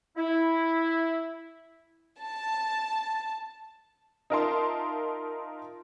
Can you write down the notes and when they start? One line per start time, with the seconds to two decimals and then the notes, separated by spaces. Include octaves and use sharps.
0.17 E4
2.22 A5
4.30 D#4 F4 A#4 E5 A5 C6